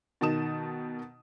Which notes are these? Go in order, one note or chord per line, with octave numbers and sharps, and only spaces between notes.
B2 D#3 D#4 A5 D#6 E7